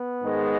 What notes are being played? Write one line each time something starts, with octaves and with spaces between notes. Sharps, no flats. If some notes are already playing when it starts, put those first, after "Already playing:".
Already playing: B3
G#2 D#3 G#3